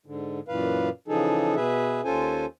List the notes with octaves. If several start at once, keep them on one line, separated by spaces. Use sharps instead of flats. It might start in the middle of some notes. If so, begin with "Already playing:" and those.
G#2 D3
F#2 A#2 E3 B4 F5
C#3 E3 F3 D#4 G#4 A4
B2 G#4 B4 E5
D#2 C#4 F4 A4 C5 G#5